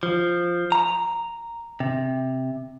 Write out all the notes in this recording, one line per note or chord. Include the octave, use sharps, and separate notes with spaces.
F3
A#5
C3